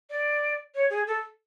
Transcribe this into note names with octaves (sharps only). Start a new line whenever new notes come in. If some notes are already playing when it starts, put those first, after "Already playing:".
D5
C#5
G#4
A4